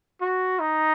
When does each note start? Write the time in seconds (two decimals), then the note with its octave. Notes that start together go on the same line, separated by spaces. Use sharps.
0.21 F#4
0.60 D#4